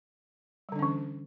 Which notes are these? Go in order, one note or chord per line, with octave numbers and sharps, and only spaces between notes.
D3 E3 G3 C#4 D4